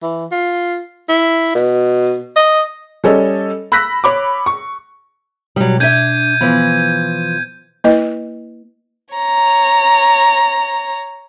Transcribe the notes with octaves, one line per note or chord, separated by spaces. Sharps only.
E3
F4
E4
B2
D#5
G3 C#4 A4 C#5 D#5
B5 E6 F#6 A#6 B6
C#5 B5 D6
C#6
B2 F#3 G3
D4 E5 G6 G#6 D#7
E3 F3 B3
A#3 E4 B4 D#5
C#5 A#5